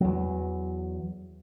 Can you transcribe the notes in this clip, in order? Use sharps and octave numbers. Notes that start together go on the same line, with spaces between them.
E2 F#3